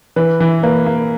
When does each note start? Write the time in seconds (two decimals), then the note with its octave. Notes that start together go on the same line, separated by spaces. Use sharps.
0.16 E3 B4
0.40 E3
0.63 A#3 B4
0.86 A#3